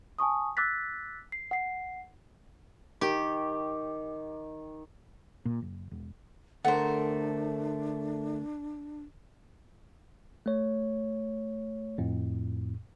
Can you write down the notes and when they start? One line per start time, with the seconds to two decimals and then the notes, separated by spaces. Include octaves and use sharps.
0.19 G#5 A5 C#6 D#6
0.57 D6 E6 F#6 A6 B6
1.32 C7
1.51 F#5 C7
3.01 D#3 G4
5.45 A#2
5.62 F#1
5.91 E1
6.64 D2 A3 D4 A#4 C5 F#5
10.46 A3 C#5
11.98 F2 A2